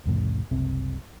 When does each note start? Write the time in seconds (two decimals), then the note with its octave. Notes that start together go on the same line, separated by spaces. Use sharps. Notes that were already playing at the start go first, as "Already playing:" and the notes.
0.06 C2 F2 A2 C#3
0.51 F#1 C2 C3 C4